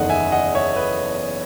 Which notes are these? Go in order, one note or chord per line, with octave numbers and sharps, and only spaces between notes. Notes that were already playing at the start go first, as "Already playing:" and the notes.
Already playing: F#1 E2 D#3 A3 D#5 F#5
E5 G#5
D#5 F#5
C#5 E5
B4 D#5